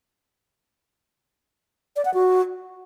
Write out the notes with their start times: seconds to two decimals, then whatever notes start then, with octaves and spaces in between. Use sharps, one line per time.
1.96 D5
2.05 F#5
2.14 F#4